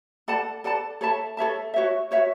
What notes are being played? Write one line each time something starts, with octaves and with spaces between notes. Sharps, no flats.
A4 D5 F#5 A5
A4 D5 F#5 A5
A4 C#5 E5 A5
A4 C#5 E5 A5
F#4 C#5 E5
F#4 C#5 E5